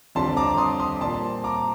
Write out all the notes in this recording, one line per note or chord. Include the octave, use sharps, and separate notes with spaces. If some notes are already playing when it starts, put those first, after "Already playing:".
F2 D3 G3 C4 A5 C6
A#5 D6
C6 D#6
C6 D#6
A#2 G3 C4 A5 C6
A#5 D6